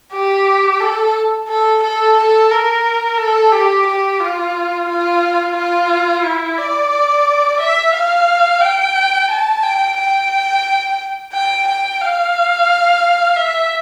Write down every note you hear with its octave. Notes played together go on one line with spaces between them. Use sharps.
G4
A4
A4
A4
A4
A#4
A4
G4
G4
F4
F4
F4
E4
D5
E5
F5
G5
A5
G5
G5
G5
G5
F5
E5